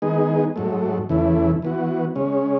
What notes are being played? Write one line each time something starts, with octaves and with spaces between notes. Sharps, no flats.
D#3 G#3 B3 D#4 G#4
G#2 F#3 A3
E2 C#3 E3 A3 E4
E3 B3 F#4
C#3 G#3 C#4